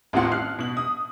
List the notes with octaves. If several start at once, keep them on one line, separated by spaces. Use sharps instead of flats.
A1 D#2 C4 F4 F#5 C6
F6 F#6 C7
B2 F#7
D#6